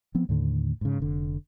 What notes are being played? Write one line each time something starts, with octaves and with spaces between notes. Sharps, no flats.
F3 B3 C4
D#2 A2 D3
G#2 C#3
F1 D3